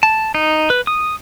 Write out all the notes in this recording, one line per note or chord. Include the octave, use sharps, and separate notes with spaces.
A5
D#4
B4
D#6